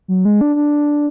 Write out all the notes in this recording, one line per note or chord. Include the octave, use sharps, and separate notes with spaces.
F#3
G#3
D4
D4